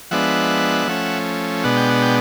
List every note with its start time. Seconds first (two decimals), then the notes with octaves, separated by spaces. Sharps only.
0.11 F3 G#3 B3 D4 E5 F#5
0.88 F3 A3 C#4
1.64 B2 G#3 B3 D4 F#5
1.77 G5
1.90 F#5
2.02 G5